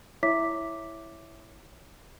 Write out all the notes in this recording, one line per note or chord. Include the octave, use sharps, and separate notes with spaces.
E4 C#5 E5 D6 B6